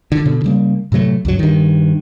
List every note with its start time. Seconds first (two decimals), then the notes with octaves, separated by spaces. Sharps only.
0.12 D3
0.26 B2 D3
0.44 C#3 G3 A#3
0.92 A2 C3 F#3 A3
1.25 C#2 G2 F#3
1.39 G2 D#3